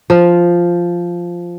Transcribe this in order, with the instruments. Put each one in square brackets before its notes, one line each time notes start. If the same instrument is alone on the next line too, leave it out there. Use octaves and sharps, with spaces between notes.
[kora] F3